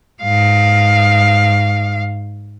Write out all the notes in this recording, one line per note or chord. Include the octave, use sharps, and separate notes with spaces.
G#2 F5